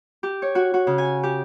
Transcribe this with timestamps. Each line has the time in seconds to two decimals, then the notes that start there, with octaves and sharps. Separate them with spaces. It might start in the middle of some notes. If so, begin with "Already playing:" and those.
0.23 G4
0.42 C#5
0.55 F#4
0.74 F#4
0.87 C#3
0.98 G#5
1.23 G4